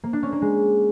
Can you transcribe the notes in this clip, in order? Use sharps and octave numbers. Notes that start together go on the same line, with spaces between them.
A#3
D4
C#4
A#3
G#3